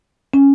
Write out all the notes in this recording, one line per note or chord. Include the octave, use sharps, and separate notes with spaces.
C#4